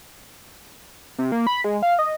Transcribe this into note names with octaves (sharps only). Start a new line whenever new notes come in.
C3
A#3
B5
G#3
F5
D#5